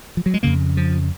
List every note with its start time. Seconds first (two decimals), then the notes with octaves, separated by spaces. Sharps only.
0.17 F3
0.26 F#3
0.34 G#3
0.43 F2 C#3 A#3
0.77 F3